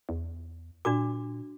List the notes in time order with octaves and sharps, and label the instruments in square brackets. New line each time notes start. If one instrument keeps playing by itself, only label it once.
[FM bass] E2
[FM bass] A#2 [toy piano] D4 F#4 D6